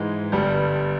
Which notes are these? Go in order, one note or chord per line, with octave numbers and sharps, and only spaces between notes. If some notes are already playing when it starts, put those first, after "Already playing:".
Already playing: G#2 E3 G#3 D#4
G1 G2 G3